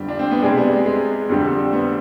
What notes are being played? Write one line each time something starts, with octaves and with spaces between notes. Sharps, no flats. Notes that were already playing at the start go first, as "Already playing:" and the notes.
Already playing: G1 F2 D3 G3
D4
C4
B3
C3 G3 G#3 D4 G#4 D5
B3
G#3
G#3
F2 D3 G3
B3